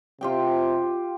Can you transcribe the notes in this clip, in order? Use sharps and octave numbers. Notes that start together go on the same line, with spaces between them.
C3 F4 G4 G5